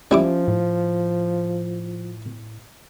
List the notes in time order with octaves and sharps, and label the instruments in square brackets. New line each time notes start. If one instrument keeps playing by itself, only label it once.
[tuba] F3 [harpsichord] G3 E4 D6 [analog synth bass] C#4
[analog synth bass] A2